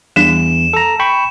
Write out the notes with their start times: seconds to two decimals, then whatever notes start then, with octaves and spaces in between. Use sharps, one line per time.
0.16 E2 G3 D4 E7
0.73 A4 A#5
0.99 G5 B5 C#6